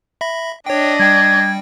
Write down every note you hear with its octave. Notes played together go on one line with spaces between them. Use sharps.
E5 B5 A#6
D4 C#5 D#5 G5
G3 G5 G#6